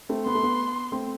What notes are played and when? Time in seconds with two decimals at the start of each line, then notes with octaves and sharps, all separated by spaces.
0.09 A3 C4
0.26 B3 C6
0.35 A3
0.43 B3
0.92 A3 C4